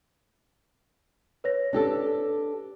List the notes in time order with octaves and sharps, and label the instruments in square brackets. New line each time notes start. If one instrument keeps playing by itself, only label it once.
[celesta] B4 C#5 A#6
[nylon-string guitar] D4 G4 A4